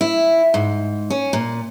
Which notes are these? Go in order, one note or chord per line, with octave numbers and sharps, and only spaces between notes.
E4
G#2
C#4
A#2